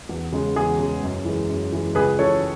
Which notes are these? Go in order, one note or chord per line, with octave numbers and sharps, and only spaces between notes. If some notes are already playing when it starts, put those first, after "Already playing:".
E2
C#3 G#3
E2 G#4
C#3 G#3
F#2
E3 G#3
F#2
E3 G#3
C#2 G#4 B4
C#3 E3 A4 C#5